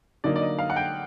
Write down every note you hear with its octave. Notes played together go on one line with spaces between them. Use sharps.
D3 F#3 A#3 D#4 D5
D5
D#5
F5
F#5
G5